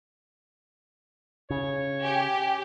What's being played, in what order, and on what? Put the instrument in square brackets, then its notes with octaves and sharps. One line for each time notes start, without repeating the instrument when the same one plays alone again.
[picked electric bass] C#3 [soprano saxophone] C#5
[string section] G4 [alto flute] G#5